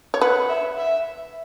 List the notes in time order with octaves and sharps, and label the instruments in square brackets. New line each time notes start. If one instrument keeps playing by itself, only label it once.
[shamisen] C#5
[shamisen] B4 [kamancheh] F#5
[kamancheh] E5
E5